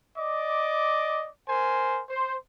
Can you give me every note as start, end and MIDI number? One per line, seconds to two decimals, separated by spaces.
0.17 1.30 74
0.17 1.30 75
0.17 1.30 86
1.49 2.02 70
1.49 2.02 72
1.49 2.02 80
2.09 2.36 72